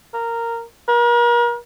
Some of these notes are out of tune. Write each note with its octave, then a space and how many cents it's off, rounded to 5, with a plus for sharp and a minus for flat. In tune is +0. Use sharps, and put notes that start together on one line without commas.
A#4 -10
A#4 +40